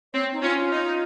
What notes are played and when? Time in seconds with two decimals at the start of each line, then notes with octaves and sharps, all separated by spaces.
0.14 C4 C#5
0.33 D#4
0.43 C#4 F4
0.57 F4
0.71 D#4